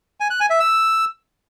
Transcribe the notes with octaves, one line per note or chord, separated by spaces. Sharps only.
G#5
F#6
G#5
E5
E6